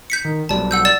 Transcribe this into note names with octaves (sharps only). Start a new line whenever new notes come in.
G6 B6 C#7
D#3
B1 F#3 G3 D5 A5
F#5 E6 G6
D5 A6 E7